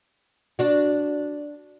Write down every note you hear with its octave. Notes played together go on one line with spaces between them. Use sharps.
D4 F#4